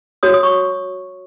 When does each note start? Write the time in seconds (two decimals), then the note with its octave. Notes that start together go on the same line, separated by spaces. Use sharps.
0.23 F#4 C#5 D#6
0.34 D#6
0.43 C#6